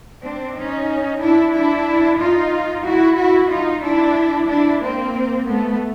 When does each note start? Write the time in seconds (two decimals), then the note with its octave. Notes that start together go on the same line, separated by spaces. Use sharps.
0.24 C4 D4
0.56 C#4 D#4
1.21 D4 E4
1.54 D4 E4
2.19 D#4 F4
2.85 E4 F#4
3.18 E4 F#4
3.50 D#4 F4
3.83 D4 E4
4.48 D4 E4
4.81 A#3 C4
5.47 A3 B3